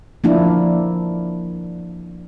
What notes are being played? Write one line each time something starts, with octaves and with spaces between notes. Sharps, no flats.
F3 A#3 D4 E4